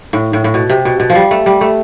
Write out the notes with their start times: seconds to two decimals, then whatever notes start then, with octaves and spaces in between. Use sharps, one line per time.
0.13 A2
0.33 A2
0.44 A2
0.54 B2
0.69 C3
0.85 B2
1.00 B2
1.10 F3
1.15 G3
1.31 A3
1.46 G3
1.61 A3